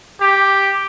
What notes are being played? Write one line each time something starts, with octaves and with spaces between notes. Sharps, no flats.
G4